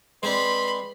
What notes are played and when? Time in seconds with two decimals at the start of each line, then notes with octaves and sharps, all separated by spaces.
0.23 G#3 C4 D4 B4 B5 C6